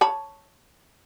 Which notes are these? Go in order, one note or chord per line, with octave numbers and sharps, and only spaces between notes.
C#5 A5 B5